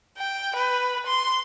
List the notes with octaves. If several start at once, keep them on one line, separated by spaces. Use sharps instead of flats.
G5
B4
C6